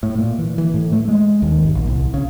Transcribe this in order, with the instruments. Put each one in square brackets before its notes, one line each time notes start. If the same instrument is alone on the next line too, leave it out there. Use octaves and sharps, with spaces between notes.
[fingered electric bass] A2
A#2
E3
E3
A2
A3
G#3
D#2
G#1
A#1
C2
C#3